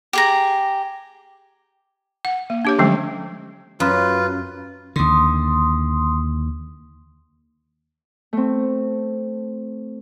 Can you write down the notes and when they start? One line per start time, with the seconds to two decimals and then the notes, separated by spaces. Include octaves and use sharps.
0.13 G4 G#4 A#5
2.25 F#5
2.50 A#3
2.65 D4 G4 C#5
2.78 D3 F3 F#3 G#3 A3 C#4
3.80 F#2 F4 B4
4.96 D#2 D3 C6 D#6
8.33 A3 C4